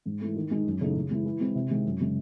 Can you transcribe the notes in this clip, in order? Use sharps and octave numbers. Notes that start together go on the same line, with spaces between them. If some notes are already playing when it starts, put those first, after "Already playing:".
G#2
E3 A3
D#3
G#3 D#4
F#2
C#3 E3 A3 D#4
C#3
E3 G#3
E3
G#3 C4 E4
C3
D#3 G#3 C4
F#2
C#3 G#3